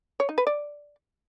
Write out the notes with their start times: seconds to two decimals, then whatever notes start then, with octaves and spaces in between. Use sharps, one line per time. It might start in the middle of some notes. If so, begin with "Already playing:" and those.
0.20 C#5
0.29 D#4
0.38 B4
0.47 D5